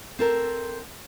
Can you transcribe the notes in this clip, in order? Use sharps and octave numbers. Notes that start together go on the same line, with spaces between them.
C4 A4 A#4